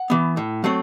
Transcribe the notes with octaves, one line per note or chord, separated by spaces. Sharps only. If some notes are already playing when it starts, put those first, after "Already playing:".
Already playing: F#5
E3 B3
A2
F#3 A3 C4